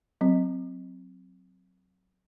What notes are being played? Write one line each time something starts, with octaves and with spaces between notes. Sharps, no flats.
F#3 C4